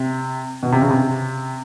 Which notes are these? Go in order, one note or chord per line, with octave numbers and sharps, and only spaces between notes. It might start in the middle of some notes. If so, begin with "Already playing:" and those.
Already playing: C3
B2
C3
C#3
C3